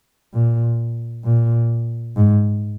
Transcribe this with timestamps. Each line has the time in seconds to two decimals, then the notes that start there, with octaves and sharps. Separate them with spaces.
0.34 A#2
1.25 A#2
2.16 G#2